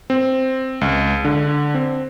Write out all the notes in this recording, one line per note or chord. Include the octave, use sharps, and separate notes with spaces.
C4
C#2
D3
C4